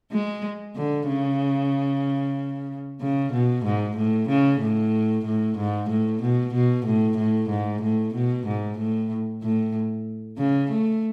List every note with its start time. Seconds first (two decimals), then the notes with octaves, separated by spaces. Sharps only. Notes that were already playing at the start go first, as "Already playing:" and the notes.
0.12 G#3
0.76 D3
1.08 C#3
3.01 C#3
3.32 B2
3.65 G#2
3.97 A2
4.29 C#3
4.61 A2
5.25 A2
5.58 G#2
5.89 A2
6.22 B2
6.54 B2
6.86 A2
7.17 A2
7.50 G#2
7.82 A2
8.14 B2
8.47 G#2
8.78 A2
9.42 A2
10.38 C#3
10.70 A3